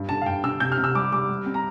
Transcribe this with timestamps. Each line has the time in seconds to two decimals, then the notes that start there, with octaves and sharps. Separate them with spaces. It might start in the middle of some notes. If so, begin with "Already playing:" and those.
Already playing: G2
0.09 D3 A5
0.22 F5
0.26 G2 G5
0.44 D3 E6
0.60 C3 G6
0.72 F6
0.78 C3
0.84 E6
0.95 G3 D6
1.12 G3 D6
1.29 G3
1.46 C4
1.54 A#5